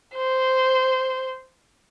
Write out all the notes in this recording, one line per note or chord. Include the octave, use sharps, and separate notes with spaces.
C5